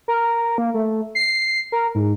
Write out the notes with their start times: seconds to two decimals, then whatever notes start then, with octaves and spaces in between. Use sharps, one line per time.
0.08 A#4
0.58 A#3
0.74 A3
1.15 C7
1.72 A#4
1.95 G#2